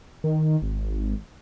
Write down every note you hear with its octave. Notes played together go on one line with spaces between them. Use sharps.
D#3
G#1